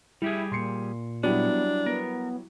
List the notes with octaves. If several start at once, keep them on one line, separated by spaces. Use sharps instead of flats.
G3 E4 G4 G#4
A#2 C6 C7 C#7
F#3 G3 B3 D4 E4
B3 A#4